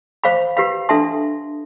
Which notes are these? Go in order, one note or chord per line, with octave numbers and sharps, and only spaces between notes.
C5 F5 B5
G4 B4 F5 B5
D4 A4 E5 A5 C6